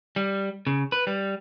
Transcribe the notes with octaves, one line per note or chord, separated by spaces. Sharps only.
G3
C#3
B4
G3